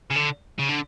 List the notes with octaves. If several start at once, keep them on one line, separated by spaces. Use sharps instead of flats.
C#3
D3
C#3
D3